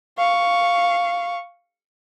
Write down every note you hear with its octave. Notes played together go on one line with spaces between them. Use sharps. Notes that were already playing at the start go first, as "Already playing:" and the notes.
F5 C#6